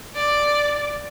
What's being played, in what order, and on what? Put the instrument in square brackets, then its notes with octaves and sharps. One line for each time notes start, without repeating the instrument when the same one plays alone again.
[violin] D5